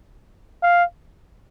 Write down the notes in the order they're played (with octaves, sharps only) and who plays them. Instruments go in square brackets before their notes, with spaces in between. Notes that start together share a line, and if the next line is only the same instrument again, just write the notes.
[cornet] F5